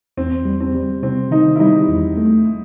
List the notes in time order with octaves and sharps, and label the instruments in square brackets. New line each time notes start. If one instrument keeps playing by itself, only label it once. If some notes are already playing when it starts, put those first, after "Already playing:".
[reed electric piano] E2 [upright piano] C4
[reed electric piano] G3
[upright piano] C4
[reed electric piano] G3
[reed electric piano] C3 [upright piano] C4
[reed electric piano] D#3 [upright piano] D#4
[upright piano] E4
[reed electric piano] G3 [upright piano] D#4
[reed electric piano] E2
A3